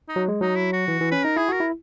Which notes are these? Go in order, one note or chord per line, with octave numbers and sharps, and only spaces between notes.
D#4
F#3
G#3
F#3 D#4
E4
F#4
E3
E3
C#4 B4
D#4 A#4
E4 G#4
F#4 A#4
E4